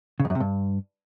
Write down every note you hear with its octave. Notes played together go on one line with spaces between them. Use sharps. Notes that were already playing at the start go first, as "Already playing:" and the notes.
C#3
F2
F#2
C3
G2